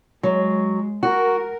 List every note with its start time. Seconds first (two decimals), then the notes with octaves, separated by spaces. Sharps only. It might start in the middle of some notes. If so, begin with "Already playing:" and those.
0.23 F#3 G#3
1.03 F#4 A#4